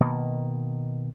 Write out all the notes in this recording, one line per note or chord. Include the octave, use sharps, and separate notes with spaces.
B2 D#3 A#3